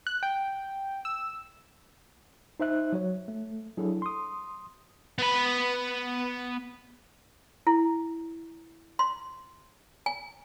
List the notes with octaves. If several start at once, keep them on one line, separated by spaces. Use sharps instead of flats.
F#6
G5
E6
D#4 C5 E5 F#6
F#3 F#4 C#5
A3
F#3 D4 E4 G#4 A4
C6 D#6
B3 B5
E4
C6
G#5